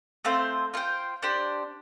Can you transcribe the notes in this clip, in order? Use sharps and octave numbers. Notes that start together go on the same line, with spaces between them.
A3 C4 F4 C5
F4 A4 C5 G5
D4 G4 C5